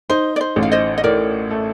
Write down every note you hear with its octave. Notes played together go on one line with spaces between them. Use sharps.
D#4 C5
D5
C5
A1
F5
C5 D#5
D#5
A2 A#4 D5
A3